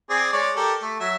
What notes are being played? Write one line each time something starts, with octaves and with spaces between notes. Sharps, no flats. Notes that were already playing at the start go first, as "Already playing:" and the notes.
C4 G#4 D5
G#3 C#5 D5
G4 A4 A#4
A3
F#3 E5